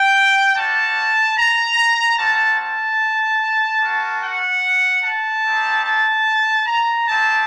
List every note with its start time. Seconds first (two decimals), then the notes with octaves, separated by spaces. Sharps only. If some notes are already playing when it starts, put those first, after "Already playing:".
Already playing: G5
0.55 G3 D4 F#4 A5
1.36 A#5
2.18 G3 C4 F#4 A5
2.59 A5
3.81 A#3 F#4
4.22 F#5
5.03 A5
5.44 C4 D#4 G4
5.84 A5
6.66 A#5
7.06 C4 D#4 G4 A5